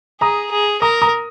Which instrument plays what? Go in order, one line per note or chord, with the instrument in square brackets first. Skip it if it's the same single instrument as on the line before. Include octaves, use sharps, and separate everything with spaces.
[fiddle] G#4 [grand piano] A#5 D#6
[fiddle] G#4
[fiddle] A#4 [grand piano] A#5 D#6
[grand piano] A#5 D#6